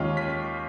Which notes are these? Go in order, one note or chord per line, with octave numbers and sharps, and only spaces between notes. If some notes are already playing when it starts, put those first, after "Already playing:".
Already playing: D#2 D#3 G#3 C#4 F4
B6